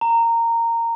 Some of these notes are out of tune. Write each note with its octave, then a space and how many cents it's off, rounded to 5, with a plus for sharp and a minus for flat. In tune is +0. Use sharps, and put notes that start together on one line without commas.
A#5 -15